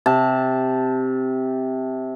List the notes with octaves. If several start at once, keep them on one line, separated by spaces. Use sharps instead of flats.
C3 A5